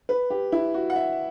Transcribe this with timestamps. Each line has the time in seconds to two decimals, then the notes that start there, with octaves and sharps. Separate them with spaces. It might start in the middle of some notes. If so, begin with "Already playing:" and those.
0.09 B4
0.30 G4
0.52 E4
0.74 F#4
0.90 F#5
0.96 E5